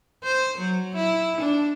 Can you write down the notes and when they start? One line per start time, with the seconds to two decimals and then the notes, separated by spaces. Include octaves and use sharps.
0.23 C5
0.58 F#3
0.96 E4
1.41 D4